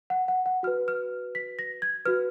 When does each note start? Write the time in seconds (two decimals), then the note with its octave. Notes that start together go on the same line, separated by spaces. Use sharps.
0.10 F#5
0.28 F#5
0.46 F#5
0.63 F#4 F6
0.67 B4
0.88 F6
1.35 B6
1.59 A#6
1.82 G#6
2.05 F#4 B4 F6